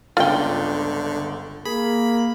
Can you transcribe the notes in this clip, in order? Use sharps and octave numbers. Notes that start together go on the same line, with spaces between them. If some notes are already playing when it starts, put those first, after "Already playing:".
G1 C#2 D3 F4 G5
A#3 G#4 B5